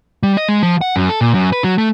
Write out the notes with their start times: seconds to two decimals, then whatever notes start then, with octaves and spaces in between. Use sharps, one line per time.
0.23 G3
0.37 D#5
0.48 G#3
0.63 F3
0.81 F#5
0.96 F#2
1.09 A4
1.21 A#2
1.34 F#2
1.53 B4
1.64 F#3
1.78 A3